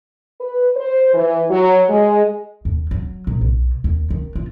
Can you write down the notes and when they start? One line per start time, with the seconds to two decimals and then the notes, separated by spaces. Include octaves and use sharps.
0.41 B4
0.76 C5
1.14 E3
1.49 F#3
1.90 G#3
2.65 D#2
2.91 F#3
3.27 A#2
3.41 B1
3.84 D#2
4.10 D#3
4.35 F4